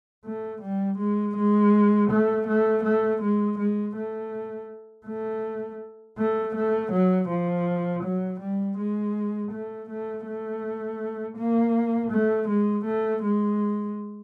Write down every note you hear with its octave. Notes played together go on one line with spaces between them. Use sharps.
A3
G3
G#3
G#3
A3
A3
A3
G#3
G#3
A3
A3
A3
A3
F#3
F3
F#3
G3
G#3
A3
A3
A3
A#3
A3
G#3
A3
G#3